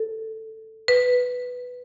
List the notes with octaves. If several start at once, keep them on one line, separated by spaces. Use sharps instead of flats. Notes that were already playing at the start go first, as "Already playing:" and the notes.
Already playing: A4
B4